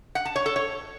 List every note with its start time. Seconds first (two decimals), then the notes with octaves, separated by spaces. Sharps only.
0.15 F#5
0.25 A5
0.36 C#5
0.46 A4
0.56 C#5